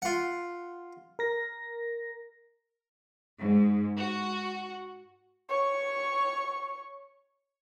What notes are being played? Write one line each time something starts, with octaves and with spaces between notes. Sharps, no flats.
F4 F#5
A#4 A#6
G#2
F#4
C#5 C#6